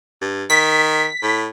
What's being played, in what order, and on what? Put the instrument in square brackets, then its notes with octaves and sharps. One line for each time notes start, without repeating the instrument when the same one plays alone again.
[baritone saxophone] G2
[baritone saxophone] D#3 [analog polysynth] B6
[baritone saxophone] A2